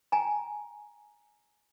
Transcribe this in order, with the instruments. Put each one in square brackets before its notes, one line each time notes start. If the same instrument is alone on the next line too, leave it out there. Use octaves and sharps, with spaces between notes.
[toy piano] G5 G#5 A#5